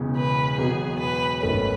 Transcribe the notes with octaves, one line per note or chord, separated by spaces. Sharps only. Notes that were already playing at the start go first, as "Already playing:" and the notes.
Already playing: E1 E2 C#3
B4
E1 E2 B2 F#3 B3 G#4
B4
G#1 F#2 D#3 A3 C#4 B4